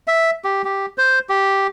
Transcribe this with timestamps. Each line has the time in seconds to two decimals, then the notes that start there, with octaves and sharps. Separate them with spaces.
0.07 E5
0.44 G4
0.65 G4
0.98 C5
1.29 G4